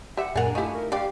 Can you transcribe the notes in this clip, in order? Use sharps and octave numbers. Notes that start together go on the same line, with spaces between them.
G4 E5 F#5
F#2 A#2 D4 G#4 A#4 F#5 G#5
F3 A3 D#4 E4 G4 C#6
A#4
D4 G4 D5 F5 G5